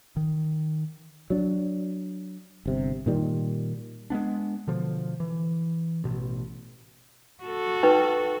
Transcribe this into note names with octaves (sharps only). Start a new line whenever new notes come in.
D#3
F#3 D4
G1 C3
A#2 D#3 G3
G#3 A3 B3 D4
B2 D3 F3
E3
A1 B2
F#4 A4
D#4 B4 G5